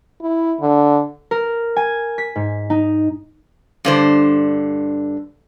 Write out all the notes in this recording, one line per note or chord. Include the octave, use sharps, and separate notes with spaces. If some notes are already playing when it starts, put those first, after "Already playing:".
E4
D3
A#4
G#5
B6
G#2
D#4
G2 D3 C5